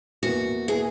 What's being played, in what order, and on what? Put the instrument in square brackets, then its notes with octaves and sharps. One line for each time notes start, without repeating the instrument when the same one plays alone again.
[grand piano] E2 B2 A#3 E4 B4 [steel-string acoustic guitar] F#4
[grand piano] B2 A#3 E4 B4 [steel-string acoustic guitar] G#4